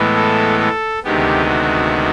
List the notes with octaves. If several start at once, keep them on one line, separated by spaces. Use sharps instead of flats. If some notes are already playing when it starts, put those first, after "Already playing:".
Already playing: A2 E3 G#3 B3
A4
A4
D2 C3 D#3 G#3 B3 G4
F#4